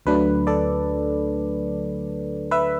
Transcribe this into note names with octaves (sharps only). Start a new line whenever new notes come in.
D2 D3 F#3 A3 D4 B4
A4 D5
B4 E5